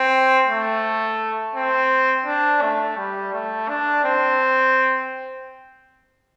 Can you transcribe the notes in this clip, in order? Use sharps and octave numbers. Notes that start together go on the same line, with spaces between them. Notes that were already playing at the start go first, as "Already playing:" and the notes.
Already playing: C4
A3
C4
D4
A3
G3
A3
D4
C4